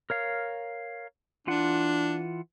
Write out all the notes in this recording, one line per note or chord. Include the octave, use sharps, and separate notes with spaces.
A#4 C#5 F5
E3 D4 F4 F#5